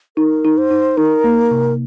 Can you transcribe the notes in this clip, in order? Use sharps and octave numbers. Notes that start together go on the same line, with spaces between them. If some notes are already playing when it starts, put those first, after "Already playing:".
D#4 A#4
D#4
C5
D#4
D#4 A#4
A#3
C3